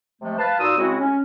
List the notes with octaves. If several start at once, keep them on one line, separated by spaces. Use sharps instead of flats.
C3 F3 G#3 A3
B4 F5 A5
A#2 D#4 F#4 C6 D#6 E6
C#3 G#3 C4 E4 F#4
C#4